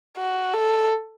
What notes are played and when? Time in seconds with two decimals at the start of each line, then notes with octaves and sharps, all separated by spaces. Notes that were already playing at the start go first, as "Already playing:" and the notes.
0.18 F#4
0.54 A4